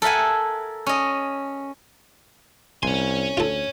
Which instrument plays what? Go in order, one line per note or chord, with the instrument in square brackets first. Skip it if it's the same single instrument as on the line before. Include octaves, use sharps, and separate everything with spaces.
[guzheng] A4 A#4 E5 F#5 G#5
C#4 D#5
[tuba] C2 [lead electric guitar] C#5 G#5 [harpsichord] C6
[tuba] D2 [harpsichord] F4 A4